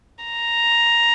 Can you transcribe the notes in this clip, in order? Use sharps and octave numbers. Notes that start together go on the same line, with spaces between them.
A#5